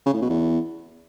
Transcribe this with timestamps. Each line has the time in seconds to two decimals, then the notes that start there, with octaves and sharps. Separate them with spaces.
0.06 C#3
0.14 A2
0.22 B2
0.29 E2